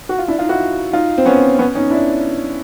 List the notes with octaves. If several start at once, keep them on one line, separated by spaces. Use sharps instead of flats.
F#4
F4
D4 E4
D#4 F4
E4 F#4
D#4 F4
C4
B3 C#4
B3 C#4
C#4 D#4
D4 E4